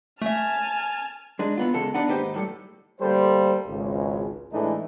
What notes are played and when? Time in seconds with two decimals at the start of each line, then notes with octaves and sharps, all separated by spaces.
0.22 A3 E5 G#5 A5 F6
1.39 G#3 D4 D#4
1.57 E3 B3 F4
1.74 E2 C#3 G#3 A4
1.94 B3 D4 D#4 B4 D5 F#5
2.08 D#2 G#2 D#4 G4 B4 C5
2.34 A2 G3 A4
3.01 D2 G3 A#3 A4 C5
3.67 G#1 C#2
4.52 A2 E3 G#3 A3 D4 D#4